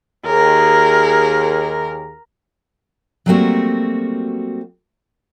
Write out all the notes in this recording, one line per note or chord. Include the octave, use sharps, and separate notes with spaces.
D#2 G#4 A#4
F#3 G3 A3 A#3 C4 F#4